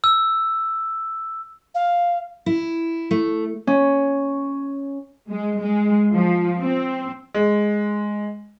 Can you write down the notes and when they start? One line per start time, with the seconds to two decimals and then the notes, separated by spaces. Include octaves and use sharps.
0.04 E6
1.74 F5
2.46 E4
3.11 A3
3.67 C#4
5.30 G#3
5.62 G#3
6.13 F3
6.60 C4
7.34 G#3